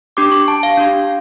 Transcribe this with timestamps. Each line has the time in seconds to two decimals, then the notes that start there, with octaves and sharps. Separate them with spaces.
0.17 D4 G4 D6
0.32 C#6
0.48 A5
0.63 F5
0.77 D4 G4